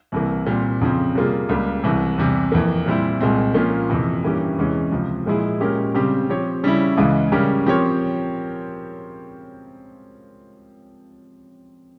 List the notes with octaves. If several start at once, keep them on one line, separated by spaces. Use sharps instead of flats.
C2 C3 E3 A#3
A#2 G3 C4
F2 C#3 F3 C4
C3 G3 A#3 F4 G#4
C#2 C#3 G3 A#3
C2 C3 E3
E2 C3 G3
F2 E3 A#3
A#2 G3 C4 E4
C2 A#2 G#3 C4
A#2 F3 A#3 C#4 F4
F2 C3 E3
G2 E3 A#3 C#4 G4
E2 C3 E3 G#3 C#4
C#2 C3 F3
A#2 F3 G#3 E4 G#4
A#2 G#3 C#4 G4 A#4
C#3 G3 C4 G4
F3 C4 G4 C#5
C#3 G3 C#4 E4
C#2 C#3 E3 G#3
C#3 G3 C#4 G4 A#4
F3 C4 G4 A#4 C#5